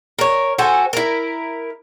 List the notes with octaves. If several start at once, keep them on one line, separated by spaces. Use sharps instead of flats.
A#4 C#5
F#4 A4 C5 G#5
E4 A#4